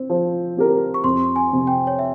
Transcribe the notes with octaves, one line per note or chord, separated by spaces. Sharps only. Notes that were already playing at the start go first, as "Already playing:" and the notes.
Already playing: C4
F3
C4 G4 A#4
C#6
F2 C6
G#5
C3 F3
G5
C#5
E5